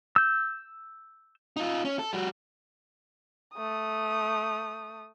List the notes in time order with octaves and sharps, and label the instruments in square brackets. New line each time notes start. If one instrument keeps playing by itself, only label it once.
[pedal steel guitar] E6 G6
[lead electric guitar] D#4 F4
C#4
A4
G3 F#4
[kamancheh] A3 D#6